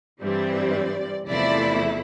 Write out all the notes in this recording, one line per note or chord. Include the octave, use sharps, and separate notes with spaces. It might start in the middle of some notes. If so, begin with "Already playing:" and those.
G2 E3 G3 C4 D5
E2 C3 F3 A3 E4 D5